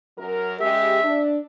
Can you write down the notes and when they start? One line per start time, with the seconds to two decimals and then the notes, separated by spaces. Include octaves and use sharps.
0.17 F#2 F#3 A#4
0.61 C#3 G#3 G4 E5
1.03 D4